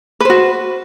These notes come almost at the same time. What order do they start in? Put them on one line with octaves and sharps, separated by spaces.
B4 C5 F#4